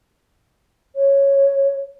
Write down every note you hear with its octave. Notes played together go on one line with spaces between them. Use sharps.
C#5